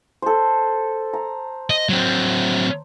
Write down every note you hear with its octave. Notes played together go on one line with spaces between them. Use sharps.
A4 C5
A#5
D#5
F#3 C4